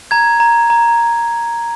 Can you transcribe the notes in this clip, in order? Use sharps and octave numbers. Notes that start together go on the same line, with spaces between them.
A#5 G#6
A#5
A#5